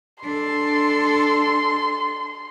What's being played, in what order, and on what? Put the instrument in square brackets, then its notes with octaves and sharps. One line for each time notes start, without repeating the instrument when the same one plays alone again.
[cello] D4 A4 [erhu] C6